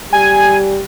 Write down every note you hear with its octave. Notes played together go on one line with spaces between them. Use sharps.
G3 G#5